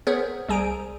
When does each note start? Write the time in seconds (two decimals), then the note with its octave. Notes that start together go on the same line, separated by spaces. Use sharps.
0.07 B3 G#4 A#4 C5 C#5
0.49 C2 G3 G#4 G#5 A#5 D7